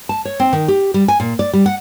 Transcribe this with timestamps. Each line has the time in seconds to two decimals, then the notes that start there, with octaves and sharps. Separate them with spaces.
0.09 A5
0.25 C#5
0.40 C4
0.53 D#3
0.68 G4
0.94 G3
1.08 G#5
1.20 A#2
1.39 D5
1.53 G3
1.66 F#5